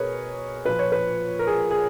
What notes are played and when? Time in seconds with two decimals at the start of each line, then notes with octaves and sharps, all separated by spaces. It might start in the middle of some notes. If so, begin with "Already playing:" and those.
Already playing: B2 G#4 A#4 B4 C#5
0.65 A#2 F3 B4
0.79 C#5
0.92 B4
1.39 A#4
1.47 G#4
1.71 G#4